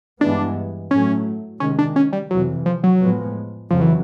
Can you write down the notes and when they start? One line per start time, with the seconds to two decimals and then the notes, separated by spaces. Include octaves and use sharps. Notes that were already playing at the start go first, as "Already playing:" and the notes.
0.21 G2 E3 G#3 B3 D4
0.91 A2 F#3 A3 C#4
1.60 C3 D#3 G#3 C#4
1.79 D4
1.96 C#4
2.13 G3
2.30 F2 C3 E3 F#3
2.66 F3
2.84 F#3
3.00 A2 F3 G#3 B3
3.70 F2 C#3 F3 F#3
3.81 E3